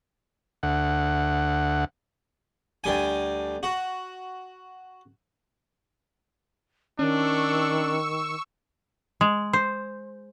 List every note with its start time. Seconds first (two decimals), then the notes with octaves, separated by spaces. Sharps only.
0.63 D2 F#5
2.84 D2 G3 G#5
3.63 F#4
6.99 D#3 C#4 D4 C#6 E6
9.21 G#3
9.53 C5